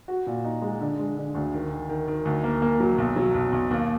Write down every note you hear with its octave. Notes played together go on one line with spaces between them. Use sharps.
F#4
A#2
D#4
G#3
D3
G#3
D3
D2
D#3
D#3
D#3
D#3
D2
A#3
A#3
F#3
B1
F#3
B1
B1
D#2